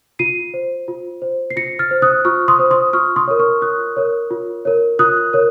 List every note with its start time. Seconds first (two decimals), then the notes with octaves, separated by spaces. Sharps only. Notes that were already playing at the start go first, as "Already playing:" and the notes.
0.19 F4 C7 D#7
0.54 C5
0.88 F4
1.22 C5
1.50 C7
1.56 F4 A#6 C#7
1.79 F6 A6
1.91 C5
2.02 D#6 F#6
2.25 F4 C#6 F6
2.48 C6 D#6
2.59 C5
2.71 C6 D#6
2.93 F4 C#6 F6
3.16 C6 D#6
3.27 A#4 C#5
3.39 C#6 F6
3.62 F4 D#6 F#6
3.97 A#4 C#5
4.31 F4
4.65 A#4 C#5
4.99 F4 D#6 F#6
5.33 A#4 C#5